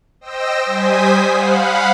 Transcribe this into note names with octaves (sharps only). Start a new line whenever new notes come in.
C5 D#5 G5 E6 A#6
G3 C5 G#5 D#6 B6
F5 F#5 B5